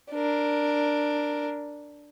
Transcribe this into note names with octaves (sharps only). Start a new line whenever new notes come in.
D4 A#4